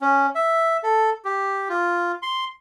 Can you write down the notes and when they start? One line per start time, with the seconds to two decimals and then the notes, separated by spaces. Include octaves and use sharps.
0.01 C#4
0.35 E5
0.83 A4
1.25 G4
1.69 F4
2.22 C6